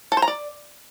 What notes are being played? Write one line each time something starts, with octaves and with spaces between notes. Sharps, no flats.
A4
C5
A#5
D5